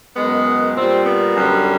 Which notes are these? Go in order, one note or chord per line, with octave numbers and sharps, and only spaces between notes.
F#2 D#3 G#3 B3
A#2 G3 C4
B3
F#2 D3 G3